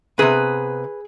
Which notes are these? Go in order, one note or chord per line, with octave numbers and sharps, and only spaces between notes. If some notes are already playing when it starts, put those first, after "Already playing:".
C3 E3 B3 G#4 B4